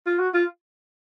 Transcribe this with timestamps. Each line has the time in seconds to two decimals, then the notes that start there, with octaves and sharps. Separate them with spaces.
0.06 F4
0.19 F#4
0.34 F4